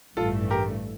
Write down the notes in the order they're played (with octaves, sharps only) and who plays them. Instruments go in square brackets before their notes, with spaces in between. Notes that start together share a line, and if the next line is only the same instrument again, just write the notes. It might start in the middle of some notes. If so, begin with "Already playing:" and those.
[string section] A1 G2 E3 A3 [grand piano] F4 A4
[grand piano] G4 A#4